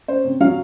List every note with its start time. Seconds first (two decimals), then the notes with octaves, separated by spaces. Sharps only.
0.08 C#4 C5
0.25 C3
0.40 F#3 F5